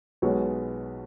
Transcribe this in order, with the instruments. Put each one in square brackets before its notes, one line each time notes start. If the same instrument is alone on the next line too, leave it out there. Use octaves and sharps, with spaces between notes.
[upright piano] B1 B2 G#3 B3 C#5